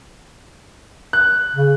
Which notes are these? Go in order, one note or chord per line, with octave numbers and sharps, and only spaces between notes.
F#6
C#3